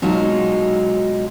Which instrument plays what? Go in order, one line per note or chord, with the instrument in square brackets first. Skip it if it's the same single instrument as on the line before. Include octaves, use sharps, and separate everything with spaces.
[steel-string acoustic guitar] B2 F#3 G#3 D#4 F4